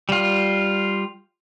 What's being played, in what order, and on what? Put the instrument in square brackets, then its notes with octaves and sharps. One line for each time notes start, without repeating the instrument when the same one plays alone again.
[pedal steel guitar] G3 F4